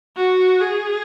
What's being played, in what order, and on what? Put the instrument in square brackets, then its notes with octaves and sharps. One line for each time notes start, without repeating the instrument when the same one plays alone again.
[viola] F#4
G#4